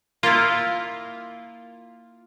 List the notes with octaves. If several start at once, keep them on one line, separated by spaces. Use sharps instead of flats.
A#3 E4 F4